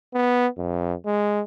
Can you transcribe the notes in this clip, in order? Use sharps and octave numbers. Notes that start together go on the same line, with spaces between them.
B3
F2
G#3